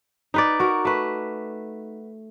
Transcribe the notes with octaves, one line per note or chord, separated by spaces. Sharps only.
D#4 B4 D5
F#4 A#4
A3 B4